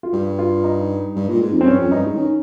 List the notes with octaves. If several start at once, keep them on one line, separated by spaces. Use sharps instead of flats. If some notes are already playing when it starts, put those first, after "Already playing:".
F4
G2 G4
F4
D#4
G2
A#2
G#2
F2
C4
G2 C#4
F2
G2 D#4
G#2
D#3 C#4